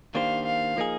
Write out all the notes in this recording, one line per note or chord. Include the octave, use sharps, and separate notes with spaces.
D#3 A#3 D4 G4 C5 F5
F5
F3 A#3 D#4 G#4